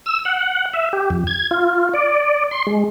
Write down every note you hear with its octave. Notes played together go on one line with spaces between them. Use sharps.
E6
F#5
E5
G4
F2
G#6
F4
D5
C6
G#3